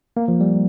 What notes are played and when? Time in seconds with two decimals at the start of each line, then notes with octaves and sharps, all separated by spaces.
0.17 A#3
0.28 F3
0.41 G3